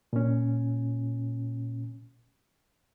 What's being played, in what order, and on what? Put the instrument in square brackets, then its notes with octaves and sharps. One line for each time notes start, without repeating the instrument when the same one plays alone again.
[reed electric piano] A#2 C#4